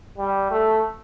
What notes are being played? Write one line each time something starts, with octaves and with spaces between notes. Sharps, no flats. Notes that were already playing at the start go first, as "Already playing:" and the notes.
G3
A3